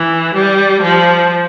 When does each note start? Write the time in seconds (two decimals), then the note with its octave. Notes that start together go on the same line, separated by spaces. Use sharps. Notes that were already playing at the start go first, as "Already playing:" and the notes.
Already playing: E3
0.35 G3
0.82 F3